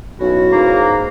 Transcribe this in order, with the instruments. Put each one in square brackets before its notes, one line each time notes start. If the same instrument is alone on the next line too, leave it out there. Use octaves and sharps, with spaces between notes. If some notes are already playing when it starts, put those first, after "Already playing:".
[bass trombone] B1 [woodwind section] C#4 E4 F#4
[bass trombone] G#2 [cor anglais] A#3